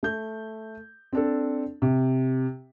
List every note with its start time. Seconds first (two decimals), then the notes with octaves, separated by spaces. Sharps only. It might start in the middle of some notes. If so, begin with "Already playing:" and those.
0.03 A3 G6
1.13 C4 D4 A4
1.82 C3